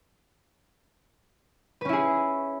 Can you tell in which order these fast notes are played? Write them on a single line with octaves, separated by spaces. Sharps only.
B4 C#4 E4 G#4